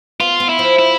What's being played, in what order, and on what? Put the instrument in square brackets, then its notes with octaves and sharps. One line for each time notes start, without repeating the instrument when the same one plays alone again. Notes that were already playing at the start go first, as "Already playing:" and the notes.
[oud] B3 [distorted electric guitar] F4
[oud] B3
[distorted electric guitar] E4
[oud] F3
[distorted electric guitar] E4